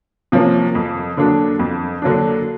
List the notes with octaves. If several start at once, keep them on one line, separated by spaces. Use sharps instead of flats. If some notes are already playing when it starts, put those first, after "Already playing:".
C3 F3 A#3 C#4
F2
D3 F#3 A#3 D4
F2
D3 F#3 A#3 D4